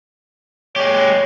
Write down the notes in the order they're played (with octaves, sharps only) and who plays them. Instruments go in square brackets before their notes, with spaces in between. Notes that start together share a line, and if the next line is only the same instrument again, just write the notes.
[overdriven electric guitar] G#3 G4 [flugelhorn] C#5